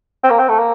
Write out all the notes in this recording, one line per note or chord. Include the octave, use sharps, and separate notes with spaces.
C4
A#3
C4
A3
A#3